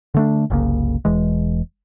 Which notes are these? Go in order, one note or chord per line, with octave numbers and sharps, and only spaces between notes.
D3 A3 D4
F#1 C2 C#3 A#3
E1 E3 G#3